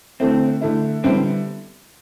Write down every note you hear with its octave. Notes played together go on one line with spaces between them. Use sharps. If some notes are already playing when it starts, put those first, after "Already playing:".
D3 A3 C4 E4
D3 A3 E4
D3 G3 B3 C4 E4